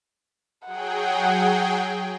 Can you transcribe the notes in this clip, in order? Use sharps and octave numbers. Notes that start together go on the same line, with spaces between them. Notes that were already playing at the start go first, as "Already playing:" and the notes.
F#3 G#4 F#5 G5